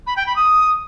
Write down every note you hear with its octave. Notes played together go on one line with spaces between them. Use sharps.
B5
G5
B5
D#6